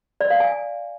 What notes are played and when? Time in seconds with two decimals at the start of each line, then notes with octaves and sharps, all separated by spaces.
0.21 D5
0.30 F5
0.40 G#5